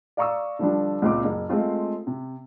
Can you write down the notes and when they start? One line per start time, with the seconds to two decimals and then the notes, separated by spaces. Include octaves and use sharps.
0.17 D5 F5 A#5 C#6 D#6 E6
0.59 D3 F3 G3 D4
1.02 C#2 A#2 C4 F4 D6
1.24 F#1
1.49 G#3 A3 C4 F4
2.07 C3